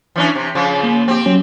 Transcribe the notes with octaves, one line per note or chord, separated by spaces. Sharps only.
E3 C#4 D4
C3
C#3 F3
A#3
C4 G4
F#3 C#4